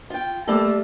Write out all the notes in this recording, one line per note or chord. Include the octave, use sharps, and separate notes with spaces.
F4 G5
G3 A3 A#3 A4